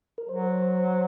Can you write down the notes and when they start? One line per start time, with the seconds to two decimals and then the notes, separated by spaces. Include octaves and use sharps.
0.18 A#4
0.29 F#3 C5